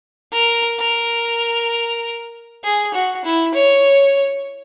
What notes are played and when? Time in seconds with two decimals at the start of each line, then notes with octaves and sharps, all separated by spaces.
0.32 A#4
0.79 A#4
2.64 G#4
2.94 F#4
3.25 E4
3.55 C#5